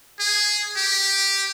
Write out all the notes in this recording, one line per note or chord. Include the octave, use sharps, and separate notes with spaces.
G#4
G4